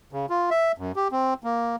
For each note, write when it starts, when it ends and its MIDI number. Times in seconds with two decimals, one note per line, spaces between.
0.13 0.26 49
0.30 0.50 65
0.51 0.72 76
0.78 0.92 42
0.96 1.08 67
1.12 1.34 60
1.44 1.76 58